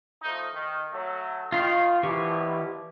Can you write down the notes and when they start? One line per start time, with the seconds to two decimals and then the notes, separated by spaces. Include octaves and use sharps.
0.23 F3 A3 D#4
0.54 D#3
0.93 F#3 A3
1.52 D#3 F4 F5
2.03 A#1 B2 E3 G4 C#6